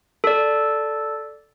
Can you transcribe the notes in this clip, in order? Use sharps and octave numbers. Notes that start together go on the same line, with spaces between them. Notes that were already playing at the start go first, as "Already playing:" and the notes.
A4 D5